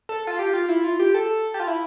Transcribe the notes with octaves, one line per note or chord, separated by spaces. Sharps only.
A4
F4
G4
F4
E4
F4
G4
A4
G4
F4
E4